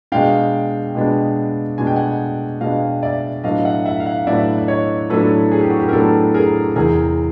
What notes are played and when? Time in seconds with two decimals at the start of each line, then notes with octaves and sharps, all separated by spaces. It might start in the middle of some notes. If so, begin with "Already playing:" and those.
0.12 B2 G#3 B3 D4 F5 G5
0.95 B2 G#3 B3 D4
1.78 B2 G#3 B3 D4 G#5
1.87 G5
1.96 F#5 G#5
2.61 B2 G#3 B3 D4 D#5 F5
3.03 D5 E5
3.44 A2 F#3 B3 D4 D#5 F5
3.65 E5 F#5
3.85 E5 F#5
4.00 F5
4.06 E5 F#5
4.27 A2 F#3 B3 D4 D5 E5
4.58 D5
4.68 C#5 D#5
5.10 A2 F#3 B3 D4 A4 B4
5.51 G#4
5.61 G4
5.70 F#4
5.80 G4
5.89 A#4
5.93 A2 F#3 B3 D4 G4 A4
6.34 G#4 A#4
6.76 E2 C3 E3 G#4 A#4